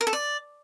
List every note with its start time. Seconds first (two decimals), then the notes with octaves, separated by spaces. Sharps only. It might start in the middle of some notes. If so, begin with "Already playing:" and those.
0.01 A#4
0.07 A4
0.13 D5